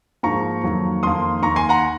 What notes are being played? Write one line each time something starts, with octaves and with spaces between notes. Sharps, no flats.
G#2 F3 A#3 A#5 C#6
F2 D#3 F#3 A#3
F2 D#3 A#3 C6 D#6
D#2 D#3 A#3 A#5 C#6
G#5 C6
F#5 A#5